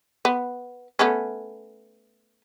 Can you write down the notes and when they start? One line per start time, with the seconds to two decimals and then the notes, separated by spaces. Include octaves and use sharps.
0.25 B3
0.99 A3 B3 C#4